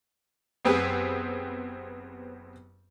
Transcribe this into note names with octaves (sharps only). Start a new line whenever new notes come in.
F#1 B3 C4 G4 G#4 B4